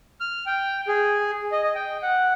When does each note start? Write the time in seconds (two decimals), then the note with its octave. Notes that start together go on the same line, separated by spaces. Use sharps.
0.20 F6
0.46 G5
0.88 G#4
1.52 D#5
1.64 D#5
1.75 G5
2.03 F#5